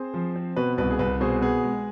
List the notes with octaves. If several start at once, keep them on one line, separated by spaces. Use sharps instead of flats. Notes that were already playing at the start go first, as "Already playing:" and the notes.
Already playing: C4 G#4 C5
F3
C4
B2 B4
C2 B4
G#4
C2 B4
B2 G#4 C5
B3 G#4
G#3